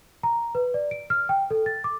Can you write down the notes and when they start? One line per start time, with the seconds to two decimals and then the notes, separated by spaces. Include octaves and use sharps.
0.23 A#5
0.55 B4
0.74 D5
0.91 D7
1.10 F6
1.29 G5
1.50 A4
1.66 A6
1.84 D6